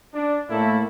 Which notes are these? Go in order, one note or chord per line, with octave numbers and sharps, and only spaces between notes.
D4
A2 A3 A#3 E4 A4